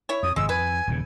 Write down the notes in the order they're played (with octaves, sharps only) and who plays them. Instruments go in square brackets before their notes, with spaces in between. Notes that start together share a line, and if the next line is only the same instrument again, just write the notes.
[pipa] E4 C#5
[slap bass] F2 [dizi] D#6
[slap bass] G#1 F2 C3 [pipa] G#3 [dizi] E6
[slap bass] F2 [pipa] B4 [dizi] G#5
[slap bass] D#1 E2 C#3